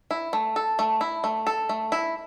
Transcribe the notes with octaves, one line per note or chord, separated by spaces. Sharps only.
E4
A3
A4
A3
E4
A3
A4
A3
E4